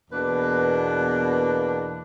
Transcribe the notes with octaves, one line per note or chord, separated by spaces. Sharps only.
E2 B2 A#3 D4 B4